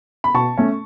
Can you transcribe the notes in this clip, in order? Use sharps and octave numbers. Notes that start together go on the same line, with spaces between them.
B5
B2 A5 C#6
A3 C#4